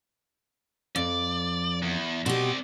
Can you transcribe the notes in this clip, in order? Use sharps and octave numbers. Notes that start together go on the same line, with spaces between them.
F2 D5
E2
B2 C4 G4 D5